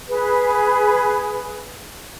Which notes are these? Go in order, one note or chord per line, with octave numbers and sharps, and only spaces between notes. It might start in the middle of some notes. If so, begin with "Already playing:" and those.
G#4 B4